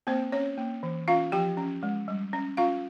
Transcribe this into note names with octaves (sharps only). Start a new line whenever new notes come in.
A#3 C4 C5
C#4 C#5
A#3
E3
C#4 F4 F5
F3 G4 G5
C#4
G#3
G3
C#4
C#4 F4 F5